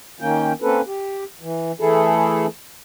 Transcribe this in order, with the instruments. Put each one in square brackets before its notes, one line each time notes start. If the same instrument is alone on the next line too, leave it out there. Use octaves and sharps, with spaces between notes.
[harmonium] D#3 A#3 C#4 G5
A#3 C4 C#4 A4 B4
G4
E3
E3 A3 E4 G#4 A4